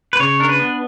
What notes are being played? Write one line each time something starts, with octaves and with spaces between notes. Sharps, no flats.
B4
C#3 C#5
D4 A#4
B4
B3